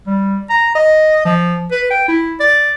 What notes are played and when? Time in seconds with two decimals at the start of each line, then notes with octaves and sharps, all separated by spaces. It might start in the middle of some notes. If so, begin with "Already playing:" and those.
0.06 G3
0.50 A#5
0.75 D#5
1.25 F3
1.71 B4
1.90 G5
2.08 E4
2.40 D5